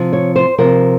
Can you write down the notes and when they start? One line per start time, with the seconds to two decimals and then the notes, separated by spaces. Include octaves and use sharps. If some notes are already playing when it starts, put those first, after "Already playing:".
Already playing: C3 F3
0.13 C#5
0.36 C5
0.58 C3 F3 A#4